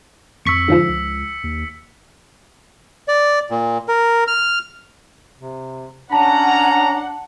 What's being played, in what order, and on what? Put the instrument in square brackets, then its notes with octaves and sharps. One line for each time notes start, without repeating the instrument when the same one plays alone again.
[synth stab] A1 C#6 [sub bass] F2 [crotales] E6 B6 C#7
[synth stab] G#2 D3 F3
[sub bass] C#2
D#2
[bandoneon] D5
A#2
A#4
F6
[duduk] C3
[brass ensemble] C#4 A#5 [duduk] D4 [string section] F#5 [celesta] A5